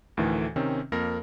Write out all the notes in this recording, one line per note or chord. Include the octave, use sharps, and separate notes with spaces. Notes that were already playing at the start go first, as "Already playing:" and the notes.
D2 A2 D#3 E3
C3 D#3 C4 C#4
F2 A#3 A#4 A#6